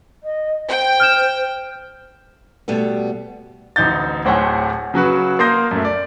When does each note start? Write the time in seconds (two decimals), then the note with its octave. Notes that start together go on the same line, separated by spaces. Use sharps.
0.23 D#5
0.69 C5 G5
1.00 F6 G6 E7
2.68 B2 G3 A3 B3
3.76 A1 D2 D#4 G6 A6
4.25 D1 A2 C5 C#5 F#5 G#5
4.94 C#3 F#3 F#4 B4
5.39 A#3 A#4 C6 D#6 G6 A#6
5.71 F#2 A3
5.85 D5